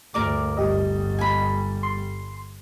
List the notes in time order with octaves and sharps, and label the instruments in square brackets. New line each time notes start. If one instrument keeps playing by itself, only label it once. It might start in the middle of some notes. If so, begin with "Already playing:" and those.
[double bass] D2 G2 [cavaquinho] A#4 D5 D6
[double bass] G1 G3 [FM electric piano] G4 D#5
[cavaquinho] G#5 B5
[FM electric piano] C6